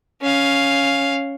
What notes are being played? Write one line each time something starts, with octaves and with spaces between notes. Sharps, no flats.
C#4 F5